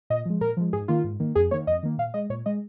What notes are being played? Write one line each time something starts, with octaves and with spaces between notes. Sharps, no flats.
A#2 D#5
F3 G#3
A#2 A#4
F3 G#3
G#2 G#4
D#3 A#3 F4
G#2
D#3 A#3
F2 G#4
D#3 A#3 C#5
F2 D#5
D#3 A#3
A#2 F5
G#3 D#5
A#2 C#5
G#3 D#5